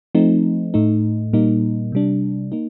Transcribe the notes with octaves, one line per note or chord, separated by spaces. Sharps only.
F3 A3 C4 D#4
A2 A3 D#4
A#2 G3 A#3 D#4
C3 G3 D4
A#3 D#4